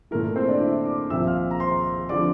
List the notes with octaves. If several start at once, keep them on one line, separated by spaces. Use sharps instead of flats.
A#2 A3 E4 A#4
A#4
C4 C5
D4 D5
E4 E5
D5 D6
C2 A#2 F3 C4 E5 E6
F5 F6
A#5
C5 C6
D3 F3 C4 D5 D6